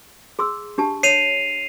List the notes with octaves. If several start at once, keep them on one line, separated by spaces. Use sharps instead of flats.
G#4 C6 E6
D4 G4 A5
C#5 C7 D#7 F7